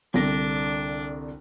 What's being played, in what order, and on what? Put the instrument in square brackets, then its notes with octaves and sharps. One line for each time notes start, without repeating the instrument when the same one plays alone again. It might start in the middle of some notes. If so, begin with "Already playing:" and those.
[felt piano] C2 D3 A#6 [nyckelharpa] D4